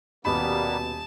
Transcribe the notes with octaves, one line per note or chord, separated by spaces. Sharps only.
D#1 B2 G3 A#3 B3 A5 B5